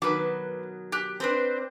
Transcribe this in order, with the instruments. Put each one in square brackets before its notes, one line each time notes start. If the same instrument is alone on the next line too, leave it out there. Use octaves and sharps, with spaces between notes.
[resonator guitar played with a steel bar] B2 D#3 F#3 [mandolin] B4 D6
[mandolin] G4 F#6
[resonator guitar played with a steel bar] C4 [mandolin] D4 B4 C5